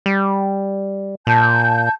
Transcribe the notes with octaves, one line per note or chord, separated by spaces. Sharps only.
G3
A#2 A5 G6